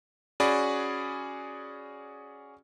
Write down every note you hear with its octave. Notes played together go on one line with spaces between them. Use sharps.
C#4 F#4 G#4 D5 B5